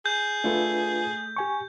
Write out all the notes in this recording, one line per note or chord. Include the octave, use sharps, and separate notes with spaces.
G#4 G6
A3 D4 F4 B4
G4 G#5 C#6